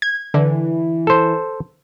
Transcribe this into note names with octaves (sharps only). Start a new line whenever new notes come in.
G#6
D3 E3
A4 C5